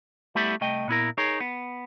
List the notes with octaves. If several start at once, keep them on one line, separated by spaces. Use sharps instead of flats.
G3 A3 B3 E4 G4
C2 A3 D#5 G5
A#2 B3 E4 A#4
D#4 G#4 A#4 C#5
B3